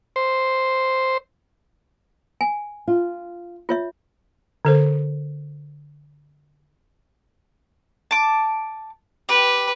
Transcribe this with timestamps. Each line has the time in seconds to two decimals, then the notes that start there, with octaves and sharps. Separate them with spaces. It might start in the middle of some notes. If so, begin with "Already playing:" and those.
0.16 C5
2.41 G#5
2.88 F4
3.69 F4 C#5 E5
4.65 D3 A4 C5
8.11 A5 D6
9.29 G4 B4